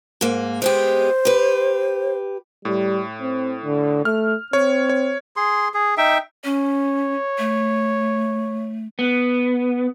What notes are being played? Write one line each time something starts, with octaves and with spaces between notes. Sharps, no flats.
G#2 A#3
G#3 B3 G4 C5
G4 B4
A2 G3
C4
D3
A3 F6
C4 C#5
C#5
G#4 C6
G#4
D#4 E5 G5
C#4 C#5
A3
B3